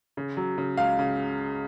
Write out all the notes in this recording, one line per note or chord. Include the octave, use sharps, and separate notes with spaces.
C#3
F#3
C#3
C#2 F5
C#3